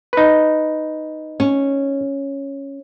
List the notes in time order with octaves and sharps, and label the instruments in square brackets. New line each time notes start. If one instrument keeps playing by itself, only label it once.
[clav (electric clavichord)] D#4 B4
[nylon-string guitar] C#4